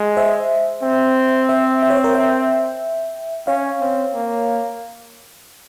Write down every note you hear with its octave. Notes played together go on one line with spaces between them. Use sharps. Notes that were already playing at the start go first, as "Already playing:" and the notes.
Already playing: G#3
C5 E5
C4
C5 E5
E5
C#5
C5
A#4 C#5
E5 G5
C#4 C#5 F5
C4
A#3